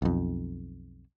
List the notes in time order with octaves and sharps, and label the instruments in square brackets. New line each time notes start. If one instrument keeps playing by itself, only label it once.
[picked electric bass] B1 F2